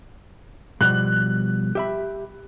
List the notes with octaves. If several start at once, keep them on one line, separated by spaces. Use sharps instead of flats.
B2 F3 G3 F#6
G4 E5 B5